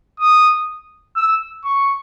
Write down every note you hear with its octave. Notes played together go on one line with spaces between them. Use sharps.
D#6
E6
C#6